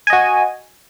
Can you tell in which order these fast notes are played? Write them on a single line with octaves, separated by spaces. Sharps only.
G#5 D#5 F#4